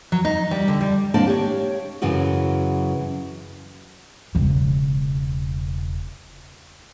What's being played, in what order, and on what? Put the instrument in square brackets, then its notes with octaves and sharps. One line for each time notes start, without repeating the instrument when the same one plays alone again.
[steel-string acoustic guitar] F#3
D#4
G3
D3
G3
[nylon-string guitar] D#2 A#3 C4 D4 A5
G4 C#5
F#2 C#3 E3 F#3 F#4
[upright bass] E1 C#3